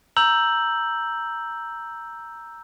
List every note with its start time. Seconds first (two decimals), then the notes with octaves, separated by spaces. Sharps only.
0.16 A#5 E6 G6 F#7